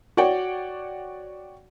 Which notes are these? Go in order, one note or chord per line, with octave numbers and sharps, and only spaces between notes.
F#4 C#5 D5 F#5 G5